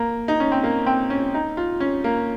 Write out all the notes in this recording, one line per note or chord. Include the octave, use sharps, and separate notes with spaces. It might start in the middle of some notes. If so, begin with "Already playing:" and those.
Already playing: A#3
D#4
C#4
C4
A#3
C4
C#4
D#4
F4
C#4
A#3